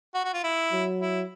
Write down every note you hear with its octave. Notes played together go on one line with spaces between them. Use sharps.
F#4
F#4
F4
E4
F#3
E4